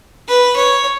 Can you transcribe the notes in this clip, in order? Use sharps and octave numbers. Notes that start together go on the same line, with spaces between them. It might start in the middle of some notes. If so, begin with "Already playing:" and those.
B4
C#5